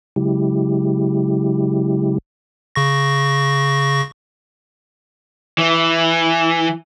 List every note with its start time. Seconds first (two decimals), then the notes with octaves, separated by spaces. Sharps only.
0.16 C#3 F#3 G#3 E4 G4
2.76 C#3 C#6 A#6
5.58 E3